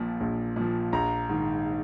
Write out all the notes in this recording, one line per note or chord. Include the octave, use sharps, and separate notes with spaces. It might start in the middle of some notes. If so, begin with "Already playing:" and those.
Already playing: A#1 A#2 F3
A#1
A#2 F3
A#1 A#5
G#2 D#3